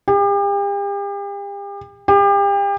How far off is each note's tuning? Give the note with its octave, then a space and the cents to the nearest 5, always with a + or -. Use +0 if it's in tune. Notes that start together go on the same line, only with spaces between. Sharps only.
G4 +40
G4 +35